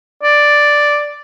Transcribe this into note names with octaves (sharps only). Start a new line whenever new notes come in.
D5